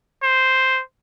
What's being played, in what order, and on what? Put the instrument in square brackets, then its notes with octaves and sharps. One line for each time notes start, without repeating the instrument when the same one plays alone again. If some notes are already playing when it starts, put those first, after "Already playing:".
[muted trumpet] C5